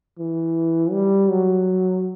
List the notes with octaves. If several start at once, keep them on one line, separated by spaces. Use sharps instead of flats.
E3
G3
F#3